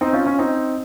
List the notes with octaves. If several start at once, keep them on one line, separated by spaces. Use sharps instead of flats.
C4 D#4
C#4 F4
C#4 F4
C4 D#4